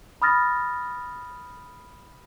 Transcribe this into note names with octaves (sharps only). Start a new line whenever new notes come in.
B5 D#6 F6 A6 A#6